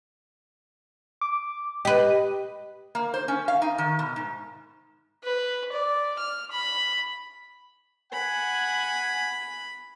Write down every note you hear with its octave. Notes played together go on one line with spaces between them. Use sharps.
D6
G4 B4 D#5
A#3
C5
C#4
F5
D#4
D#3
B2
G#2
B4
D5
F6
B5
F#5 G#5 B5